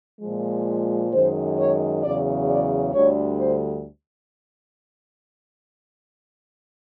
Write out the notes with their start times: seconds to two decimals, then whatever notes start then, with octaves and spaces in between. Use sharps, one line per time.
0.21 A#2 F3 G#3
1.13 F#2 D#3 G#3 C5
1.58 C#5
2.04 E2 C#3 F#3 D5
2.50 D5
2.94 D2 D3 G3 C#5
3.40 C5